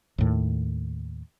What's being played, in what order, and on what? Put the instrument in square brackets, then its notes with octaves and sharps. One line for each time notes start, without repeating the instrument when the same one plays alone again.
[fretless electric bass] D#2 A2 D#3